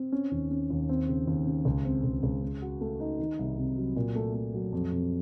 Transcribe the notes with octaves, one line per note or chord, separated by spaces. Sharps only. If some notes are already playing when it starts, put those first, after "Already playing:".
Already playing: C4
C#4
D#2
C#4
D#2
C4
C#3
D#2
C#3
C#2
C4
C#2
C#2
C#3
F#4
A3
D#4
D#3
C2
C3
F#3
A#2
A3
A3
F#3
F2
F2